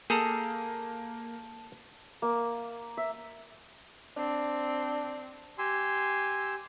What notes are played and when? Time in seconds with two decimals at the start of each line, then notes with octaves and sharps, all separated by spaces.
0.10 A#3 G#4 A4 A5 A#5 G6
2.22 A#3
2.97 E5
4.17 C4 D4
5.59 G4 G#5 C6 E6